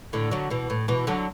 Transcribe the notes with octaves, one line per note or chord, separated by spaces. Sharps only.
A2 D3
D3 F#3
B2 E3
A2
B2 E3
D3 F#3